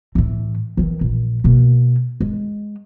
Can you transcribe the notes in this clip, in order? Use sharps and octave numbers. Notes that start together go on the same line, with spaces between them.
A2 E3
D#3 E3
A#1
B2 A#3
G#3